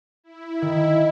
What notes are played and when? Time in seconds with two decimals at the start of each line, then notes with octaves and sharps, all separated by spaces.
0.24 E4
0.62 D#3